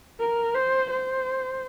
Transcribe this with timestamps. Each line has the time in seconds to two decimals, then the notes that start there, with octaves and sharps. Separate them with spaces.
0.20 A#4
0.55 C5
0.90 C5